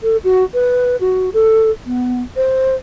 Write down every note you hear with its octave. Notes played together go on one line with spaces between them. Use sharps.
A4
F#4
B4
F#4
A4
B3
C5